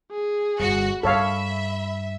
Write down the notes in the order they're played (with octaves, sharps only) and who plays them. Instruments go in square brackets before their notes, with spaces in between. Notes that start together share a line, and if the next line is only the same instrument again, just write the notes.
[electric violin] G#4
[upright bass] G1 [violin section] F#4
[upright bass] G2 [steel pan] A4 C#5 F5 [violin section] E5 [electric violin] B5